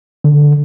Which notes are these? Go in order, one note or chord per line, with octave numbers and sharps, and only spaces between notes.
D3